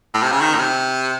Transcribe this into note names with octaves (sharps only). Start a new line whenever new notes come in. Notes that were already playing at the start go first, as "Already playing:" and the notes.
A2
C3
C#3
D#3
A2
C3